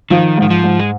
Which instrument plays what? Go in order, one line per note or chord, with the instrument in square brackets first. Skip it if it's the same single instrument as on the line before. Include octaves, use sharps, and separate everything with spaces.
[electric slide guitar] D#3 [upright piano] F3
[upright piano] G#2 [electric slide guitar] D#3
[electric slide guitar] F3
[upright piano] G#2
[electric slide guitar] G#3